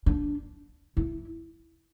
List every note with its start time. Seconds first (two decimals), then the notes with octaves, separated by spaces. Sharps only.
0.06 D4
0.97 E4